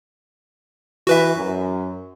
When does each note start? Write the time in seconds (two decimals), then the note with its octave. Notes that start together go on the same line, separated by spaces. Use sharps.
1.07 E3 F#4 B4 E5
1.36 F#2